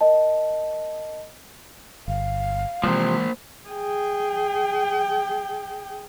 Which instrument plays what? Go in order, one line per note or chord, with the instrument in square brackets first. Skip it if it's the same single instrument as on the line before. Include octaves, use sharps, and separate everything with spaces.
[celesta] A#4 D#5 A5
[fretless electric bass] G1 [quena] F5
[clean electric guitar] C3 F3 [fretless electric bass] E3 G#3 [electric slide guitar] A#3 C5
[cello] G#4 G5